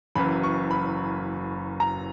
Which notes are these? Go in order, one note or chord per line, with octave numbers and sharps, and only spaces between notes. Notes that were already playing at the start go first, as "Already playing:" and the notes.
F#1 F#2 E3 B5
C#6
B5
A#5